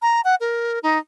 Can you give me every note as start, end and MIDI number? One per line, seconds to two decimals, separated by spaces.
0.02 0.21 82
0.24 0.35 78
0.40 0.79 70
0.83 0.98 63